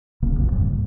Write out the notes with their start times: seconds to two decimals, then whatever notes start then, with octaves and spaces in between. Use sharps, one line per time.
0.22 D1 C2 C#3 A#3
0.36 A#1 F2
0.51 D1 G#2 C#3 G3
0.65 A2